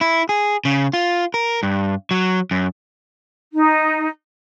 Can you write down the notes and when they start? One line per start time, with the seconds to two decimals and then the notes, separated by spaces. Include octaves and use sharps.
0.01 E4
0.29 G#4
0.65 C#3
0.93 F4
1.34 A#4
1.63 G2
2.11 F#3
2.51 F#2
3.53 D#4